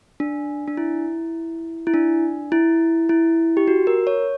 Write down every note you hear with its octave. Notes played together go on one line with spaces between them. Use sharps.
D4
D4
E4
E4
D4
E4
E4
G4
F#4
A#4
C#5